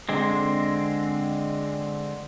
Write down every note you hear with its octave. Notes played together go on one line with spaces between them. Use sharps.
D3 G#3 C4